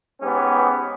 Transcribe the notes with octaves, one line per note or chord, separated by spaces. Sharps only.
G#2 B3 C#4 G4